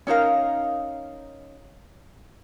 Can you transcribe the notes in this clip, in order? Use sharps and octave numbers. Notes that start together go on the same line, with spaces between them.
C#4 D#4 A#4 F5